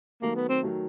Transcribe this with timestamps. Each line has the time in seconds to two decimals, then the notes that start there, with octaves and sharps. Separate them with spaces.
0.22 D#3 F#3 A3 A#3
0.35 B3
0.49 C4
0.63 D#3 F#3 A3